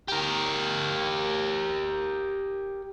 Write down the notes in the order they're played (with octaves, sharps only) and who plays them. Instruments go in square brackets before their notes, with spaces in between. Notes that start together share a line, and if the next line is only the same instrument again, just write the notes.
[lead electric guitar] G4 A#4